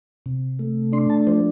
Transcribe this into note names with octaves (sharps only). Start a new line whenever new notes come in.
C3
A3
D4 C6
A5
F3 C5